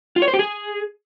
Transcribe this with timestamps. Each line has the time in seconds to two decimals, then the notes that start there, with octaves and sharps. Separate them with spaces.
0.16 F4
0.22 C#5
0.28 C5
0.34 G4
0.39 G#4